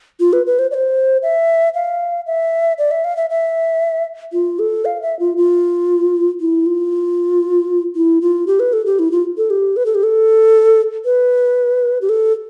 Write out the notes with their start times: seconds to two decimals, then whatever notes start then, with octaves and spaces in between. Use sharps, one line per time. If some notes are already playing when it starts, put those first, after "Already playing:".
0.20 F4
0.33 B4
0.46 B4
0.59 C5
0.71 D5
0.74 C5
1.23 E5
1.74 F5
2.27 E5
2.78 D5
2.91 E5
3.04 F5
3.17 E5
3.30 E5
4.33 F4
4.59 A4
4.85 F5
5.02 E5
5.19 F4
5.37 F4
6.41 E4
6.66 F4
7.96 E4
8.21 F4
8.47 G4
8.60 B4
8.73 A4
8.86 G4
8.99 E4
9.12 F4
9.38 A4
9.50 G4
9.77 B4
9.86 A4
9.95 G4
10.03 A4
11.05 B4
12.02 G4
12.09 A4